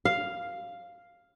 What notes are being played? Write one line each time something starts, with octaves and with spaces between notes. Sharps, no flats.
F5